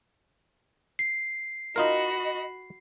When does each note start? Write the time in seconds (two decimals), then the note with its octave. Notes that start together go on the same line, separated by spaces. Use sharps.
0.99 C7
1.76 D#4 F4 F#4 A#4 D#5 B5